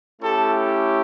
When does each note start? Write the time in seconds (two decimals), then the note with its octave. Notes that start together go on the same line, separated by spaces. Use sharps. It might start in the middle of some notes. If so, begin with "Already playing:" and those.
0.21 A3 C#4 E4 G4 A4